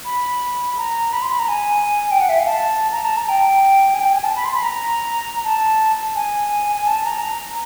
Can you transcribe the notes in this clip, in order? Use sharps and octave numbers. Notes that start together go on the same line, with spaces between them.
B5
A#5
B5
C6
B5
A#5
G#5
G5
F#5
E5
F5
A5
A#5
A5
A#5
G5
G#5
G5
G#5
A5
B5
C6
B5
A#5
A5
G#5
G#5
A5
A#5